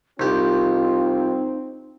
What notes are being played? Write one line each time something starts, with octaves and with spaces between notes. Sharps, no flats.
C2 C4 D#4 F4 G4